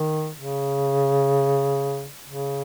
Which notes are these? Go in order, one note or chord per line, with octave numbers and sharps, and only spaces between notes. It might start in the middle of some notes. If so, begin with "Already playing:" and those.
Already playing: D#3
C#3
C#3